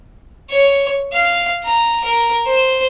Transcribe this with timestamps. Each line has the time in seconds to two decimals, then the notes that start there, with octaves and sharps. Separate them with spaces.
0.50 C#5
1.12 F5
1.63 A#5
2.04 A#4
2.47 C5